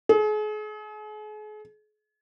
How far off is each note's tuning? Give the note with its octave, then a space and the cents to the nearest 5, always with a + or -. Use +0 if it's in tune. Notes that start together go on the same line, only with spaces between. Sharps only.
G#4 +40